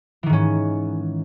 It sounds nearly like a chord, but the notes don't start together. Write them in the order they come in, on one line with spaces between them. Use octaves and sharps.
E3 D#3 G#2 C#4